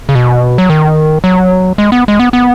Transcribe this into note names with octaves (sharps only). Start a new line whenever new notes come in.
C#3
B2
F#3
D#3
F#3
G#3
B3
G#3
B3
B3